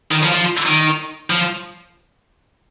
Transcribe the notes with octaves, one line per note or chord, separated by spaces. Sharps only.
D#3
F3
F3
D#3
F3